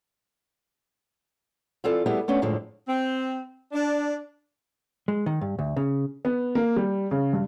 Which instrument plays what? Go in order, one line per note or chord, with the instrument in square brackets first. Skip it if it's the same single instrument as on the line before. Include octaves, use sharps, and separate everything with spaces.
[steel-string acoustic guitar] E3 C4 F4 A4 D5
G3 A3 B3 E4 G4 G#4
A3 B3 C#4 D4
F#2 A2 D3 F3 G#3
[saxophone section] C4
D4
[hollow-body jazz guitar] G#3
D#3
G2
D2
C#3
[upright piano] B3
A#3
G3
C#3
G2